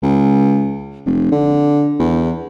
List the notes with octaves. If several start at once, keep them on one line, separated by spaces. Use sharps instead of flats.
C#2
F1
D3
E2